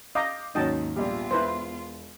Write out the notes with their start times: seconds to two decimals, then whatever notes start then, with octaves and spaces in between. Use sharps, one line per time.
0.15 D#5 F5 A#5 D6 G6
0.55 D#2 G#2 D#3 F#3 C#4 D#5 G5 A5
0.96 A#1 G3 B3 F4
1.31 E1 E4 B4 C5